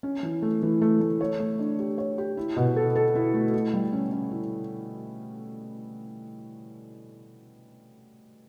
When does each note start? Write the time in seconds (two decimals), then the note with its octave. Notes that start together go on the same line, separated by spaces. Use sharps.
0.03 C#4
0.23 E3
0.42 A3
0.63 E3
0.82 A3
1.01 A3
1.21 C#5
1.40 A3
1.59 D4
1.79 G4
1.98 C#5
2.18 G4
2.37 E4
2.57 B2
2.76 A4
2.95 A4
3.15 E4
3.34 A3
3.53 E4
3.74 G3
3.93 C#4
4.12 C#4
4.31 E4